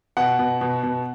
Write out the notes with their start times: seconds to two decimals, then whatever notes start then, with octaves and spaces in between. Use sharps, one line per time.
0.17 B2 F#5
0.39 B2
0.61 B2
0.83 B2